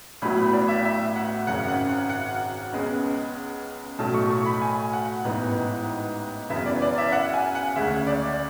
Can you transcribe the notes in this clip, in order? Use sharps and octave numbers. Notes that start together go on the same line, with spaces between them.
A1 A2 F#3 B3 B5
B5
D5
E5
E5
F#5
G#1 F#2 C#3 F#5
F#5
F#5
F#5
C#2 C#3 G#3 B3
B1 A2 F#3 A3 A5
C#6
C#6
B5
G#5
F#5
A1 G#2 E3 B3
F#2 C#3 E3 B3 E5
D5
D5
E5
E5
F#5
G#5
F#5
D2 C#3 G#3 E5
D5